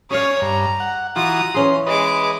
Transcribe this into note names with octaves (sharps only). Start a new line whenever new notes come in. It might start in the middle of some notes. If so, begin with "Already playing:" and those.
C#4 G#4 C#5 D5 F5 D#6
G2 A#5
F#5
E3 F4 F#4 A#5 D#6
E3 C#4 G#4 C6
G#3 B4 D#5 D6